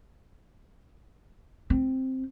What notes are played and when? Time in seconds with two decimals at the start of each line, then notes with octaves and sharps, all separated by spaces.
1.70 C4